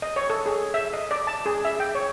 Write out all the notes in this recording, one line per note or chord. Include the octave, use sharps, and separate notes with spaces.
D#5
C#5
A4
G#4
E5
D#5
D5
A5
G#4
E5
G5
C#5